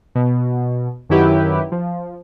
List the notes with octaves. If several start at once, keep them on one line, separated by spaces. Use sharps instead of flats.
B2
F#2 D#3 F#3 E4 G4 B4
F3